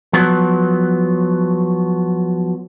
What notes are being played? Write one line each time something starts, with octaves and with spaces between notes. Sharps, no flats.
F3 F#3 B3